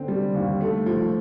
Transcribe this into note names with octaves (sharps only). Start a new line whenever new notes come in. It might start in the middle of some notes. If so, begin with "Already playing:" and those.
Already playing: D3 C4
G3
D#2
A3
F3